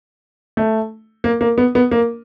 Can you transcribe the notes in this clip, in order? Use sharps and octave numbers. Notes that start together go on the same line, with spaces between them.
A3
A#3
A#3
B3
B3
A#3